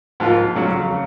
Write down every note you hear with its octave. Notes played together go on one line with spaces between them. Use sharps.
G#2 F3 A#3 F4
F2 C#3 F#3 C#4 F#4
C#3